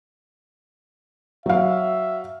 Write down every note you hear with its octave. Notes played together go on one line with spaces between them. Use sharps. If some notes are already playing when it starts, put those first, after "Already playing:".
F#3 E5 F5